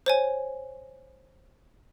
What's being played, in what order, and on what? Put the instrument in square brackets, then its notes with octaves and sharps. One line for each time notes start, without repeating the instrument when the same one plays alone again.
[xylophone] C5 C#5 G#5